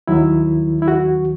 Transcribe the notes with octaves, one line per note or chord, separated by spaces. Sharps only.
D#2 D#3 F#3 E4
E4
F#4